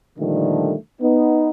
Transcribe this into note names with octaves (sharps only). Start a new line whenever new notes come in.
A#2 D3 D#3 F3 G3 A3
B3 D#4